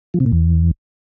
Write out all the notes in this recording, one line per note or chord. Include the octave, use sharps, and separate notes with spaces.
F3
C3
A#2
E2